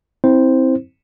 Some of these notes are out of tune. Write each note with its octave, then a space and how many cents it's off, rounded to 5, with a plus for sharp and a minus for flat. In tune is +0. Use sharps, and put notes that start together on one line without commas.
C4 +0 E4 -30 C5 +0